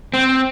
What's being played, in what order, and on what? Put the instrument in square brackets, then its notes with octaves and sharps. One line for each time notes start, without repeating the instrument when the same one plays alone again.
[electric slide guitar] C4